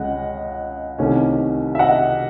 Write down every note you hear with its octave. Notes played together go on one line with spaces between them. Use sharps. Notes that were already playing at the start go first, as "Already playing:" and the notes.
Already playing: C#2 C#3 G#3 D#5 F#5
C2 C3 D#3 A3 C#4
E5
D#5 F#5